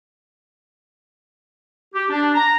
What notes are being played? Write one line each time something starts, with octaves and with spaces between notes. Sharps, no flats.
G4
D4
A#5